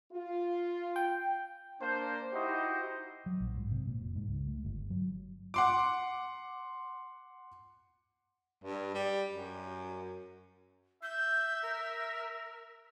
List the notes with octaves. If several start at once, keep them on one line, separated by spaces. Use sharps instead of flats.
F4
G5
A#3 D4 C5
D#4 E4 F#4 G4 C5 D#5
F#3
A#1
G#2
C3
A#2
F1
G#2
C#2
A3
G1
F#3
F#5 C6 D6
G2
G3
F#2
E5 G6
A#4